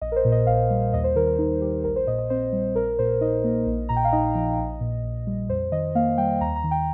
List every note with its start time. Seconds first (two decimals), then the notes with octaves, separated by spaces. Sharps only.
0.02 A#1 D#5
0.12 A#4
0.16 C5
0.25 A#2
0.32 D#5
0.47 A#1 F5
0.70 G3
0.93 D#2 D#5
1.04 C5
1.16 D#3 A#4
1.27 A#4
1.38 D#4
1.61 G3 G4
1.84 A#1 A#4
1.96 C5
2.07 A#2 D#5
2.18 D#5
2.30 C4 C5
2.53 G3
2.75 A#1 A#4
2.99 A#2 C5
3.21 D#4 D#5
3.44 A#3
3.67 A#1
3.89 A#2 A#5
3.96 G5
4.05 F5
4.12 D#4 D#5
4.35 F3
4.58 A#1
4.80 A#2
5.04 A#1
5.27 G3
5.49 F2 C5
5.72 D#3 D#5
5.95 A#3 F5
6.18 G3 G5
6.41 D#2 A#5
6.56 A#5
6.64 D#3
6.71 G5